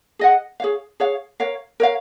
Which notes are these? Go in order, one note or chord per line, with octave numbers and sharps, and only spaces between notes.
G#4 D#5 F#5
G#4 C#5 F5
G#4 C#5 F5
A#4 C#5 F5
A#4 C#5 F5